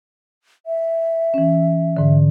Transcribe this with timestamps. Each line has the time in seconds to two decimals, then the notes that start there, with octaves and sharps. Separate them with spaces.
0.66 E5
1.34 E3 C#4
1.97 G#2 D3